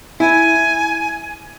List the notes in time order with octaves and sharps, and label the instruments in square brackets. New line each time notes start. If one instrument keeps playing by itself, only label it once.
[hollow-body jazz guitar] E4 [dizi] G#5